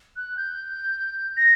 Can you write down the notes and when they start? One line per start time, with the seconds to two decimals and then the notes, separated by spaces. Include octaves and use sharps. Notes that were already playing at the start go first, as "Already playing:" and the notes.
0.16 F#6
0.37 G6
1.37 A#6